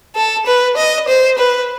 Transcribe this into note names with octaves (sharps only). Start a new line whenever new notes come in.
A4
B4
D#5
C5
B4